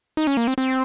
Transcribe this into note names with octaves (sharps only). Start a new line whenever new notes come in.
D#4
C#4
A#3
C4
C4